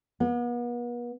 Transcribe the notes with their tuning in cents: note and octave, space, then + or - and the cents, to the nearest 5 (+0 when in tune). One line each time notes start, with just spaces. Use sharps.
B3 -40